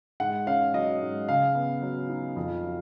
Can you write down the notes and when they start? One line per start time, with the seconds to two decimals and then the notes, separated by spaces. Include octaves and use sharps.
0.20 G#2 F#5
0.47 C#4 F5
0.74 F#3 D#5
1.01 G#2
1.28 C#3 F5
1.55 B3
1.82 F#3
2.09 D#4
2.36 F2
2.64 F#3